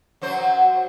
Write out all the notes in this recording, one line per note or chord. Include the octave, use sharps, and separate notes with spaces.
F#2 F#3 C5